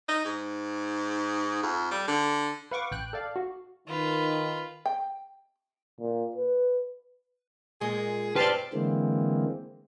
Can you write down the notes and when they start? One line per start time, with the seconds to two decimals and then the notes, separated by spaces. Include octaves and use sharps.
0.08 D#4
0.25 G#2
1.63 F2
1.91 G3
2.08 D3
2.71 B4 F5 F#5 C#6 D6
2.91 A1 G5 F#6
3.13 A4 D5 F5
3.36 F#4
3.88 D#3 F4 B4
4.86 G5
6.00 A#2
6.36 B4
7.81 A#2 G#3 G#4
8.36 C4 G4 B4 D5 A5 C6 F6
8.73 D3 E3 G#3 A#3 C4